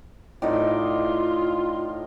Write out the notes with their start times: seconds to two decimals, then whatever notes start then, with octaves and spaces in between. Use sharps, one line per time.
0.42 A2 D#4 F4 D5